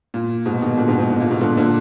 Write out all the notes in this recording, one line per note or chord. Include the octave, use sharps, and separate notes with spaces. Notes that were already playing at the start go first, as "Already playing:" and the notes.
A#2
G#2 B2
B2 D#3
A#2 D3
G#2 B2
G#2
G#2
A#2
G#2 B2
A#2 D3
A#2 D3